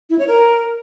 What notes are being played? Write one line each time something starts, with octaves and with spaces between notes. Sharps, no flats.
E4
C#5
A#4